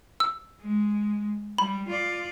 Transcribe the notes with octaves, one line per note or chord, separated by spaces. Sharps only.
E6
G#3
G3 B5
F4 D5